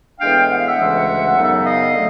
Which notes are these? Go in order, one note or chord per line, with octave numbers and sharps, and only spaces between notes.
A2 E3 G#3 B3 D4 F5 G5
F#5
F5
E5 F#5
D2 C#3 E3 G#3
F#2 C#3 F#3 B3 D#4
D#5 F5
D3 F#3 A3